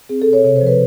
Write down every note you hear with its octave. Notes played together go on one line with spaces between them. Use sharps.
C4 G#4
A4
B2
C#5
C3 C#5
C5
F3
B4